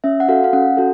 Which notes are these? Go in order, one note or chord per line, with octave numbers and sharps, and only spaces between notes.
C#4 E5
F#5
F#4 A4 F5
F5
C#4 F#5
F#4 A4